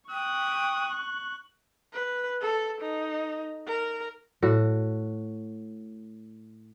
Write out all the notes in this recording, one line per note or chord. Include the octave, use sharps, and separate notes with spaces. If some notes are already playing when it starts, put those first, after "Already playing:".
G5 C#6 D#6 F#6
B4
A4
D#4
A#4
A2 F#4